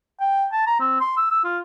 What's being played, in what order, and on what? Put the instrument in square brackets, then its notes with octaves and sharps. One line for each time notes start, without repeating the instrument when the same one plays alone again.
[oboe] G5
A5
A#5
C4
C6
E6
E6
F4